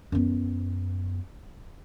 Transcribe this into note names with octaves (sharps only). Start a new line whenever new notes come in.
F#2 B3